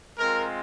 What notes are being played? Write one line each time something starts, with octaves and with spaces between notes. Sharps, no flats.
G#3 C4 F4 A#4